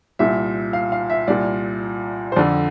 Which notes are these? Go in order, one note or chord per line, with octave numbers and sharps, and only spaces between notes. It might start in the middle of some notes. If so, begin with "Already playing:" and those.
C2 A#2 E5
F5
F5
E5
C2 A#2 D5
C5
F2 D3 D5